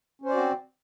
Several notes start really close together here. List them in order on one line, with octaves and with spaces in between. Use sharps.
C#4 C5 D5 F#4 C4